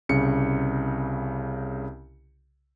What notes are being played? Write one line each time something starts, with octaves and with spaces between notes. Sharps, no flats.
C2 C#3 C#7